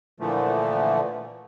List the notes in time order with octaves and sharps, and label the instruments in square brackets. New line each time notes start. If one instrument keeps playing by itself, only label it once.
[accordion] A#2 D3 E3 F3 A3